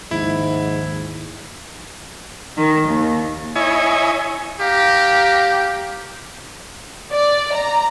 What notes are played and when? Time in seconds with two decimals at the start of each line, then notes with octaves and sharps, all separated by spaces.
0.11 G#1 D#2 G#2 F3 E4
2.57 D#3
2.89 D#2
3.56 E4 C#5 D#5 G#5
4.60 G4 F5 A#5
7.12 D5
7.54 A#5